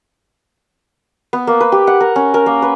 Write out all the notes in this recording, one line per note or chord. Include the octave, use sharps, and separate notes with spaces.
B3
A#3
B4
G4
F#5
A#4
C#4
A#4
A#3
B4